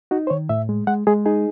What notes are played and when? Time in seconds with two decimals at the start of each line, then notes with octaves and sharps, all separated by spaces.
0.11 D#4 F#4
0.27 C5
0.30 D#3 C#5
0.49 A2 E5
0.69 G#3
0.87 G#3 F#5
1.07 G#3 G#4
1.26 D#4 G#4